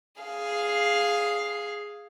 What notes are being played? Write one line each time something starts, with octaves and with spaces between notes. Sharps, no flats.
G#4 F5